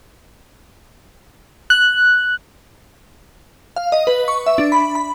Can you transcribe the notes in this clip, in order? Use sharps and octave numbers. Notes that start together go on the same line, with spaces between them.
F#6
F5
D#5
B4
C#6
E5
D4
B5
B5